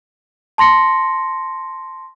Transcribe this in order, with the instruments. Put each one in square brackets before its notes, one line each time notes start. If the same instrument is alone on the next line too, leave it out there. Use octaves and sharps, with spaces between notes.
[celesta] A5 C6 A#6 C#7